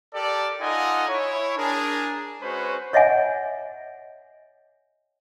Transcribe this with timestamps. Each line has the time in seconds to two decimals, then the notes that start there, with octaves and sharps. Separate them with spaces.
0.15 G4 A4 A#4 D5
0.61 D#4 F4 A4 D#5 F#5 G#5
1.09 E4 C#5
1.58 D4 G#4 A#4
2.42 G#3 C#4 F#4 B4 C5
2.93 C#5 D#5 E5 F#5 G#5